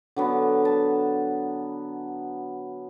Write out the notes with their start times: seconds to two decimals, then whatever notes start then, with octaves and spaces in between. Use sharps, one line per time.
0.16 D3 F#3 B3
0.65 A5